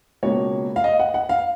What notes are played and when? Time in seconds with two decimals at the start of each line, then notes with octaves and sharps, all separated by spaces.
0.23 C#2 B2 A#3 C#5
0.76 F5
0.84 D#5
0.99 F#5
1.14 F#5
1.29 F5